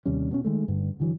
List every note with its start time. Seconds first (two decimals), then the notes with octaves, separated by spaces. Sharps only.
0.06 D#2 C3 G3 C#4
0.31 B2 B3 C#4
0.44 D#3 G#3 A3
0.68 G2 D3
1.00 D3 E3 F#3